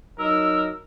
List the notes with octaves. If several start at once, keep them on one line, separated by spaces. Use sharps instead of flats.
F#3 D#4 A#4 E6